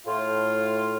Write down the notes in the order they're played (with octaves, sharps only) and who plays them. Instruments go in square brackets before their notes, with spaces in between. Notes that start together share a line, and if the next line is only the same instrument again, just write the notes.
[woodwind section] A2 F4